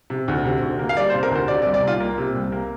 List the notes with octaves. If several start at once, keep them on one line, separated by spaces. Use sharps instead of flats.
C3
D2
C3
D2
A#3
F5
G3 D5
C5
C3
A#4
D2 C5
C3 D5
D5
C2
D5
C2 F4
A#3
C3
C2
A#3